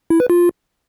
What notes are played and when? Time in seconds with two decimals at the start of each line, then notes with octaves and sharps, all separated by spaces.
0.10 E4
0.20 B4
0.30 F4